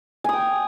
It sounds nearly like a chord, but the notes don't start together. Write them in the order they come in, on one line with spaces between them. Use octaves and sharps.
G#5 D#6 G5